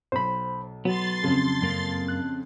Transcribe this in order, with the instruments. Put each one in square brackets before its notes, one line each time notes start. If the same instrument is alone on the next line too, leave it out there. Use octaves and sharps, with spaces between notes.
[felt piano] B1 [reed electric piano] C5 B5
[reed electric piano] F#3 [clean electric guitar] B3 [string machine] C6 A6
[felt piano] F2 C#3
[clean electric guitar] F#2 A#3
[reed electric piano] F#6